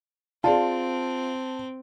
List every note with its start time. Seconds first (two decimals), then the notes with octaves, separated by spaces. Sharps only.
0.44 C4 F4 G#4 D5 F5 A5